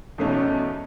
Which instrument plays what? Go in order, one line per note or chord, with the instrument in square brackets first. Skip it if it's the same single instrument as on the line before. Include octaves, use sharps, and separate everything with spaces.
[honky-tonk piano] E2 B2 A3 C#4 D#4